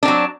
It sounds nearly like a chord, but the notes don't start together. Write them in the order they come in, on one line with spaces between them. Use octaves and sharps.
D4 C4 F#3